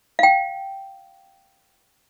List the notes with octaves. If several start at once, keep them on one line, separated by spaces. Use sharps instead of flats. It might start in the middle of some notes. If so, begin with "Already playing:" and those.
F5 G5